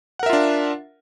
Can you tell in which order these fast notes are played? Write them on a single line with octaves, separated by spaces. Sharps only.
F#5 A#4 E5 F4 D4